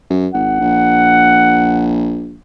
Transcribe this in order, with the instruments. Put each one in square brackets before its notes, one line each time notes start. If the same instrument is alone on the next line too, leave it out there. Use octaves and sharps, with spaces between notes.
[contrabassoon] F#2
[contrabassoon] G#1 [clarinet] F#5
[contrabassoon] A#1